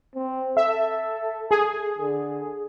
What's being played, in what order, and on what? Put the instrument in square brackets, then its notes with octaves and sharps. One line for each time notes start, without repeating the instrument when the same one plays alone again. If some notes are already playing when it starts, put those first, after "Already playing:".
[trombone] C4
[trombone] A4 [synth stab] E5
[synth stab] G#4
[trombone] D3